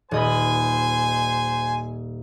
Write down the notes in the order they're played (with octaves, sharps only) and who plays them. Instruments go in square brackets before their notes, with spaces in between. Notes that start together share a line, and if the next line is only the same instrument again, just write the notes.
[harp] D#1 D#5 B5 [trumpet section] C5 G#5